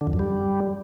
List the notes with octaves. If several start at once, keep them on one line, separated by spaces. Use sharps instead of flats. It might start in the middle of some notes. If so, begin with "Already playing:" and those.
D3
F2
F#2
G3